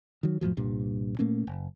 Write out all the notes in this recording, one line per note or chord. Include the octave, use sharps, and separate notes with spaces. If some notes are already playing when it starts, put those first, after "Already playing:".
D#3 F#3
F2 A2 F3 F#3
C2 G2 A#2
A#2 A3 A#3 C#4
F#1